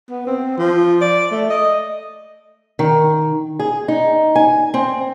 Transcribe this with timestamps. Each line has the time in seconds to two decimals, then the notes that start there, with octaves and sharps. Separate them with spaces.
0.10 B3
0.26 C4
0.58 F3
1.01 D5
1.31 A3
1.50 D#5
2.79 D#3
3.60 G#4
3.88 D#4
4.36 G#5
4.74 C4